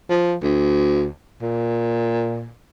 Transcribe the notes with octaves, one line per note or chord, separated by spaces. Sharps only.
F3
D2
A#2